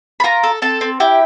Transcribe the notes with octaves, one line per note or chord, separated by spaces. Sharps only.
B5
F4 A#4 A#5
A4
C4 A4 A5
C4
E4 G4 G5